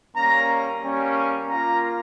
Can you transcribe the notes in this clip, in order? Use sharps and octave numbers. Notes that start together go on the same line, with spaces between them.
G3 A#3 C#4 A#5
G3 A#3 C#4
A#3 F4 A#5